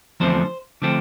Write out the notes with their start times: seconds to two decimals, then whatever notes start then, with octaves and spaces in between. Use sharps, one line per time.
0.20 E2 D3 F3 A3 C4 C5
0.82 D3 F3 A3 C4